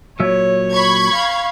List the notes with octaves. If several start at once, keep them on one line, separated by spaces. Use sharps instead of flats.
A#2 F#3 C#5 E5
B5 C#6 G#6
F5